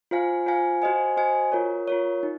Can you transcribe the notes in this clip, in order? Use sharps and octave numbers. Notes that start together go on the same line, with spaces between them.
F4 C5 F5 G#5
F4 C5 F5 G#5
F#4 C5 D#5 G#5
F#4 C5 D#5 G#5
F4 A#4 C#5
F4 A#4 C#5
D#4